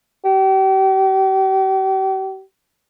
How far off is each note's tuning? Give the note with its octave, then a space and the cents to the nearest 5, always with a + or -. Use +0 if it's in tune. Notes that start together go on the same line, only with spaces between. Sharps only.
G4 -40